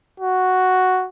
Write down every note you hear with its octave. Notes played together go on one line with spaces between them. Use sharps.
F#4